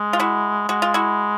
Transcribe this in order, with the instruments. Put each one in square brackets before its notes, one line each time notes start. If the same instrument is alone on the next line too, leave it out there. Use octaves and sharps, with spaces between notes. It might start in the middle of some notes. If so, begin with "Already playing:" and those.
Already playing: [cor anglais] G#3
[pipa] F4
E4 F#4
[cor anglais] G#3 [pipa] F#4
[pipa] F4
E4 F#4